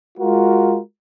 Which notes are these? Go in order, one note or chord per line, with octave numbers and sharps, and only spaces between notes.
G#3 F4 F#4 A#4